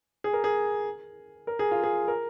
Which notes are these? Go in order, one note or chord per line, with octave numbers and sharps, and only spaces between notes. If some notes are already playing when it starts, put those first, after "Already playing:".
G#4
A#4
G#4
A#4
G#4
F4
G#4
A#4